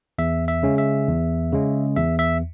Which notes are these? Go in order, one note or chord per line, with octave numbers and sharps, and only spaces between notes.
E2 E5
E5
C#3 G#3 C#4
E5
E2
C#3 G#3 C#4
E2 E5
E5